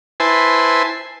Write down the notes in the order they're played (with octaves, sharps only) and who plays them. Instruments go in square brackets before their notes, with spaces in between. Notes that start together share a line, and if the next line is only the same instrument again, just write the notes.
[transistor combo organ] E4 B4 C5 G#5 A5 C6